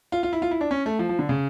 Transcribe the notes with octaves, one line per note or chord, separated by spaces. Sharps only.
F4
F4
E4
F4
E4
D4
C#4
A3
F3
F3
D3
C#3